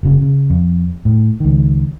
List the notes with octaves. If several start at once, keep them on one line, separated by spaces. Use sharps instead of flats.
F#1 C#3
C#3
F2
A2
C#2 D#3